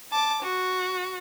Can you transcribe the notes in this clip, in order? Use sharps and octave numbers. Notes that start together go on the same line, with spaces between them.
A5 D6
F#4